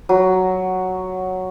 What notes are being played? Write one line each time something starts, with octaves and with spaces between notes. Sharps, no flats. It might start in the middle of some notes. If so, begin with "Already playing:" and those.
F#3